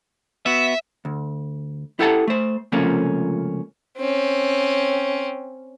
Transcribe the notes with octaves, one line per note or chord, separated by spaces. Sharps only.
B3 F#4 E5
D2
E4 G4 A4 F#5 G5 A5
A3 C5
C#2 C3 F3 A3 A#3 C#4
C4 C#4